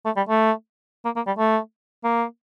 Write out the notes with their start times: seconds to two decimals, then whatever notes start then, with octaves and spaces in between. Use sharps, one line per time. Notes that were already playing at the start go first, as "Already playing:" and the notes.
0.05 A3
0.16 G3
0.29 A3
1.05 A#3
1.16 A#3
1.27 G3
1.38 A3
2.04 A#3